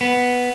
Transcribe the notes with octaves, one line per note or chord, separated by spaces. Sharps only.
B3